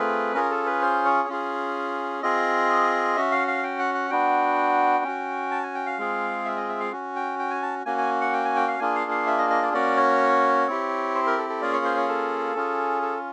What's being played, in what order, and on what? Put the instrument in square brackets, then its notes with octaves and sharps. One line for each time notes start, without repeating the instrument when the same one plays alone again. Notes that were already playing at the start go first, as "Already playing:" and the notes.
Already playing: [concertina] A3 C4 F4 G#4 B4
C#4 F4 G#4 A#4
A4
B4
C5
C#5
C#4 F4 G#4
C4 F4 G#4 D#5
C#4 F#4 E5
F5
F5
G5
F#5
F#5
B3 D4 F#4 G5
C#4 F#4
A5
G#5
G5
F5
G#3 C4 F4 G#4
E5
D#5
E5
F5
C#4 F#4
G5
G5
G#5
A5
A#3 C#4 F#4 G#5
G#5
F#5
G5
G#5
G5
F5
A#3 D4 F4 G#4 G#5
F5
F5
E5
D#5
D#5
D5
A#3 C#4 F#4 D5
C#5
C4 E4 G4
C5
A#4
A4
A4
A#3 C#4 F4 G#4 D5
C#5
C5
C#5
A4
C#4 F4 G#4
A4